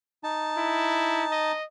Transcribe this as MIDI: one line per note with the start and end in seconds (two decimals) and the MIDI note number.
0.24 1.52 63
0.24 1.52 81
0.57 1.24 64
1.31 1.64 75